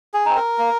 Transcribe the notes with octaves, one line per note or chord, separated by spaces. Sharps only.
G#4
C4 D#4
A#4
A#3